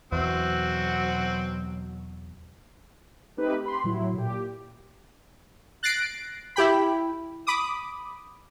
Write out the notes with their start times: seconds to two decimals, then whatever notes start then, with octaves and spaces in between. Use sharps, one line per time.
0.12 E2 B2 F#3 C4 F#4
3.37 A3 C4 D#4 G4 B4
3.63 G4 B5 C6
3.84 A2 F#3 E4
4.14 A#2 G4
5.83 F#6 A6 A#6 C7 D7
6.56 E4 G4 G5 B5
7.47 B5 D6 D#6